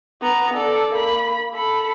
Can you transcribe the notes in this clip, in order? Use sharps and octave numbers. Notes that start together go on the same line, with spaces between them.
B3 A#5
A4 D5
A#3 B5
A4 B5